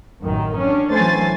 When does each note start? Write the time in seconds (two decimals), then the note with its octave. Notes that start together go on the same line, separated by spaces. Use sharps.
0.24 A1 F#2 D#3
0.56 C#4 D4
0.92 E3 F#3 A3 C5 G#5 A6